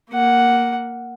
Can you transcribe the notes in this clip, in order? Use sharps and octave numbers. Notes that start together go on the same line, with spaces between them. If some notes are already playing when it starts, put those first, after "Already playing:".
A#3 F#5